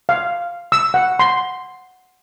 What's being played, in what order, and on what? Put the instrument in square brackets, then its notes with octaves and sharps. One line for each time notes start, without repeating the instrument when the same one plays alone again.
[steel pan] F5
E6
F#5
C6